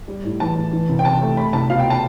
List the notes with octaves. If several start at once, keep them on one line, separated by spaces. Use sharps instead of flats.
G3
A2
E3 A5
A2
E3
C2
G5
C3 A5
A3
A3 B5
C2 A5
B2 F5
G5
A5